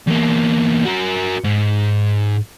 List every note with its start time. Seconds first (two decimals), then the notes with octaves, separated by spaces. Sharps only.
0.07 E2 A#3
0.85 F#4 A#4
1.44 G#2